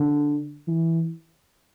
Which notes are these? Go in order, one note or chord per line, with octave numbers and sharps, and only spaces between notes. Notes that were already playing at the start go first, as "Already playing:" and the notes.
Already playing: D3
E3